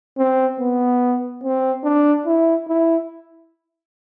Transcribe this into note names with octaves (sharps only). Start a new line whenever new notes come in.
C4
B3
C4
D4
E4
E4